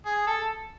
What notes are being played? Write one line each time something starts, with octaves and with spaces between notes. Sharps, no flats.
G#4
A4